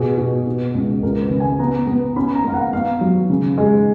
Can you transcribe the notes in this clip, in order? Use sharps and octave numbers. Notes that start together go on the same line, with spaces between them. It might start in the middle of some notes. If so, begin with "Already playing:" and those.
Already playing: B2 G#4
B2
B2
C#2
C#2 A#4
B4
C#3
G#5
B3 A#5
B3
C#4 B5
A#5
A#3 F5
F#5
B3 F5
F#3
C#3
G#3